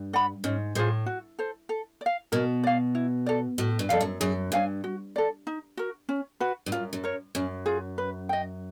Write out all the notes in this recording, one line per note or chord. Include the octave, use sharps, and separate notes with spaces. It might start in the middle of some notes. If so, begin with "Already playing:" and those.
Already playing: G2
D5 F#5 B5
G#2 C#4
A2 F4 G#4 C5
F#4
A4 C5
A4
D5
F5
B2 A#4
D5 F5
E4
A4 D5
A2 F#4
G2
F2 A4 D5 F5
F#2
F#2 G#4
G2 C#5 F5 G#5
F#4
A4 D5
D#4
F#4 A#4
C#4
F#4 B4
G2
F#2 F4
F#2
A#4 C#5
F#2 C#4
F4 G#4
B4
D#5 G5